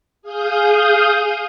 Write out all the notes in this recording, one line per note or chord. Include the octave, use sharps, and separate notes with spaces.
G#4 F5 D#6 G6